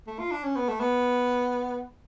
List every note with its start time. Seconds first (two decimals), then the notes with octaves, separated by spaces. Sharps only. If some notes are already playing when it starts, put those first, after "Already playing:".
0.07 A3
0.19 F4
0.31 D4
0.43 C#4
0.56 B3
0.69 A3
0.80 B3